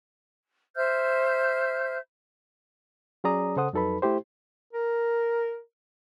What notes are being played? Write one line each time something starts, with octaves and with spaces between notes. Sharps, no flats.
C5 E5 F6 G6
F#3 C#4 G#4 D5 A#5 D#6
C#3 A4 C5 F#5 D#6
F2 F#3 D#4 A4 B4 B5
A3 E4 G4 C5
A#4